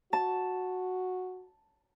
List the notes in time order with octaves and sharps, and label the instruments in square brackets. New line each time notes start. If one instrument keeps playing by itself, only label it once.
[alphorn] F#4 [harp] A5